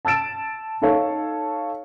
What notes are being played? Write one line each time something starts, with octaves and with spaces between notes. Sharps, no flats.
A5 E6 A6 D7 E7
D#4 A4 C#5 F5